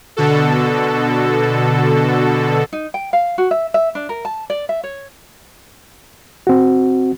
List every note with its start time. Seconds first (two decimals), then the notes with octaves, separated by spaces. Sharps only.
0.17 B2 D3 F#4 A4
2.73 D#4
2.94 G5
3.13 F5
3.38 F#4
3.51 E5
3.74 E5
3.95 D4
4.09 A#4
4.25 A5
4.50 D5
4.69 E5
4.83 C#5
6.47 C4 F#4